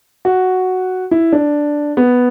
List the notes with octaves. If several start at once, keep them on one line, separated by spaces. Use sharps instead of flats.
F#4
E4
D4
B3